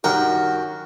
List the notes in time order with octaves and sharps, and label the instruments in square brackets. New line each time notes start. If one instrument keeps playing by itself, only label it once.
[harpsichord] F#2 F#5 G5 [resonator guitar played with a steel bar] D#3 G3 [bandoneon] F#4 [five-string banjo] A#4